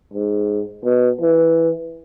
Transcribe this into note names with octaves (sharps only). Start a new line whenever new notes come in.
G#2
B2
E3